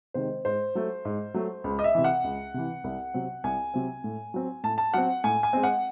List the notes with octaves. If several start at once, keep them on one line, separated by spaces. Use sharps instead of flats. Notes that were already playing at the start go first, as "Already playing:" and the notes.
C3 D#3 G#3 C5
G#2 C5
F#3 A3
G#2
F#3 A3
C#2
D#5
E5
C3 E3
F#5
C#2
C3 E3
C2
C3 F#3 C4
C2 G#5
C3 F#3 C4
A2
F#3 C4
A2 A5
A5
F#3 C4 F#5
A2 G#5
G#5
G#3 C4
F#5